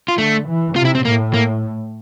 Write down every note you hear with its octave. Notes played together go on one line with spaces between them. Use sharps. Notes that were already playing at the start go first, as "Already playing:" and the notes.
F4
D3 A3
E3
C3 F4
E4
C4
A2 A#3
A#3